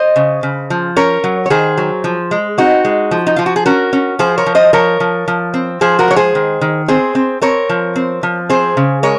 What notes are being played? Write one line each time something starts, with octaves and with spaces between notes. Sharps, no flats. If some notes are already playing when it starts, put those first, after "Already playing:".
Already playing: C5 D#5
C#3
C#3
F3
C#4 A#4 C#5
F#3
C#5
D#3 G#4 C5
F#3
F3
G#3
C4 D#4 F#4
G#3
F3
D#4
F3 F4
F#4
G#4
C#4 F#4 A#4
C#4
F3 G#4 C5
A#4 C#5
F3
C5 D#5
F3 A#4 C#5
F3
F3
C4
F3 G#4 C5
F#4 A#4
G#3 C#5
G#4 C5
D#3
D#3
C4 G#4 C5
C4
C4 A#4 C#5
F3
C4
F3
C4 G#4 C5
C#3
G#3 A#4 C#5